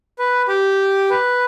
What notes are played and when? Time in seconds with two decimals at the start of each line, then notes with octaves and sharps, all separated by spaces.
0.19 B4
0.48 G4
1.10 B4